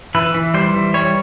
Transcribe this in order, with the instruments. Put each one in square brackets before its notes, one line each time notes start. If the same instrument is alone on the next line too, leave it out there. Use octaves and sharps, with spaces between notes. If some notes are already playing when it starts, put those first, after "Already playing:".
[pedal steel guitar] E3 B4
E3
G3 C5
E3
G3 C#5